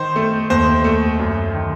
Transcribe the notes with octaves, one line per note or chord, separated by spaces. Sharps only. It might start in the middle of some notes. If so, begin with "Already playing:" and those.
Already playing: D#3 C5
A3
D#2 C5
A3
F#2
D#3